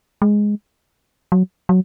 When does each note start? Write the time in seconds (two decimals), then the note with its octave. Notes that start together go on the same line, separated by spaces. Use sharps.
0.22 G#3
1.32 F#3
1.69 F#3